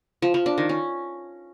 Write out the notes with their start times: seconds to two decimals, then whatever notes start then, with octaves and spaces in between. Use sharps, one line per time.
0.22 F3
0.34 F3
0.46 D4
0.58 D#3
0.69 C#4